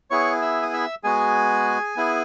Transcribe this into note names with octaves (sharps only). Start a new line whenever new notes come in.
B3 E4 G#4 C#5 C#6
E5 E6
D#6
E5 E6
G#3 B3 F#4 G#4 G#5
B3 E4 G#4